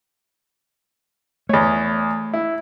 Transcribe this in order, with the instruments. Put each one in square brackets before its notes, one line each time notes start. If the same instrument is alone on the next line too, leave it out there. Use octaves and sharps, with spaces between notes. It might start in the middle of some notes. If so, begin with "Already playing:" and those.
[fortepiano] E2 C#5 [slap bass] A3
[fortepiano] E4